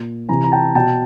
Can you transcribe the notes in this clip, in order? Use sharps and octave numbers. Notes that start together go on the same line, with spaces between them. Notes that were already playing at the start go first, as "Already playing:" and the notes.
Already playing: A#2
C3 E3 G#5 A#5
A#5
G5 A5
B2 G5 A5